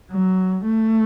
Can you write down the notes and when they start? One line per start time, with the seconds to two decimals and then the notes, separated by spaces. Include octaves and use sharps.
0.12 F#3
0.65 A3